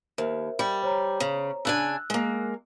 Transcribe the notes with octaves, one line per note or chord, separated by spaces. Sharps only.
D#2 A#4 C5 E5
G3
C5 C#5 A#5
C#3
C#3 D4 G#5 E6 F#6
G#3 A#3